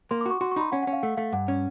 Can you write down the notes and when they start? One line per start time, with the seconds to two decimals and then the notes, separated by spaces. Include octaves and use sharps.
0.11 A#3 C6
0.21 D6
0.26 F#4
0.31 C#6
0.41 F#4 C6
0.51 C#6
0.56 D#4 B5
0.61 C6
0.72 C#4 F#5
0.83 F#5
0.87 C#4
0.93 F5
1.03 A3 F#5
1.17 A3 F5
1.33 G2 F#5
1.48 C#4